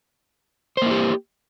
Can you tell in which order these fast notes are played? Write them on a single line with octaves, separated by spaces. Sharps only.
C5 A#3 E4 G4